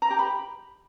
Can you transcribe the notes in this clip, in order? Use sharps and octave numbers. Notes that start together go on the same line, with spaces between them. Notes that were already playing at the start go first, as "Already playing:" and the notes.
A#5
G4
B5